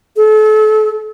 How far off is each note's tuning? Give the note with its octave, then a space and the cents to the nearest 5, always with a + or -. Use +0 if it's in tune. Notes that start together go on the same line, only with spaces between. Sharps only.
A4 -35